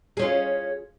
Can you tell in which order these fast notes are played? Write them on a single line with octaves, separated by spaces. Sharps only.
G#4 C#4 F4